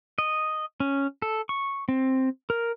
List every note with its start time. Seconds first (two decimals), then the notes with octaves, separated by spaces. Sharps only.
0.18 D#5
0.80 C#4
1.22 A4
1.49 C#6
1.89 C4
2.50 A#4